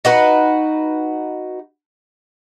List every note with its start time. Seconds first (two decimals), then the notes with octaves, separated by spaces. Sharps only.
0.05 D#4 F#4 B4